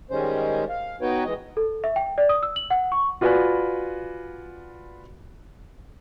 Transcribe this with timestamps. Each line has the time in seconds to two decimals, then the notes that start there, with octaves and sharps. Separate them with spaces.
0.11 D#3 G3 G#3 C#4 C5
0.69 F5
1.01 B3 D#4 F#4 B4 C#5 G5
1.24 E3 G#3 D#5
1.57 A4
1.84 E5
1.96 G5
2.18 D5
2.29 D#6
2.43 E6
2.56 F#7
2.70 F#5
2.92 C#6
3.21 F4 F#4 B4 D5 G#5 B5